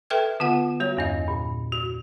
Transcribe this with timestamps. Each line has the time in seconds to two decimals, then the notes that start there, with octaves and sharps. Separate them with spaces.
0.10 A4 B4 E5 G5 F6 G#6
0.40 D3 B3 F4 F#5
0.80 G3 F#4 C#5
0.97 E2 G2 D#5
1.28 A#2
1.72 F#4